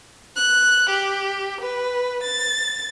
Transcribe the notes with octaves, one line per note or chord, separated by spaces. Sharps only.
F#6
G4
B4
A6